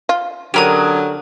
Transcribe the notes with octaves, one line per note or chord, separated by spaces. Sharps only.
F4
D3 F#3 C#4 G4 A#4 B5 D#6